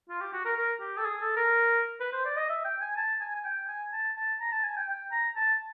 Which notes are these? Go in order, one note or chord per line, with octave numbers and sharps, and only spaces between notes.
F4
G4
F#4
A#4
A#4
G4
A4
G#4
A4
A#4
B4
C5
D5
D#5
E5
G5
G#5
A5
G#5
G#5
G5
G#5
A5
A5
A#5
A5
G#5
G5
G5
A#5
A5